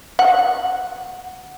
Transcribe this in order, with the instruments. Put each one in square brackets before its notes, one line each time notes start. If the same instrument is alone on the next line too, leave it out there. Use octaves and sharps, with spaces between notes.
[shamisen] F#5